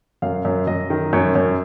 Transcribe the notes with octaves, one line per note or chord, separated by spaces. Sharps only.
F#2 F5
F#2
F#2 D#5
D#3
F#2 C#5
F#2